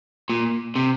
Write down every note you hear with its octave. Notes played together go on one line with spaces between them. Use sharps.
A#2
C3